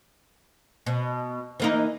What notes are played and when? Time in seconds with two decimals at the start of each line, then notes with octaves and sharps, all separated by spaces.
0.86 B2
1.60 E3 A#3 D#4